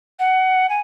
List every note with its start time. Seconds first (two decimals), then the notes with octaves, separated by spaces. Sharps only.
0.19 F#5
0.69 G#5